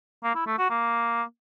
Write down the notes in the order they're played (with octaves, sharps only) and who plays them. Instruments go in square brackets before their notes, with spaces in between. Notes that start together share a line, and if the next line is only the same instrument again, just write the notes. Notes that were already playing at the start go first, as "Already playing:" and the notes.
[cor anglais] A#3
E4
A3
F#4
A#3